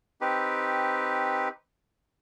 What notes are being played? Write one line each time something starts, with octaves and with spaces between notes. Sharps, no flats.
C4 D#4 G4 B4